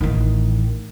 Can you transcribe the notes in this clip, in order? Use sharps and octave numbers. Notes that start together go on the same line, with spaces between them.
A1 D#3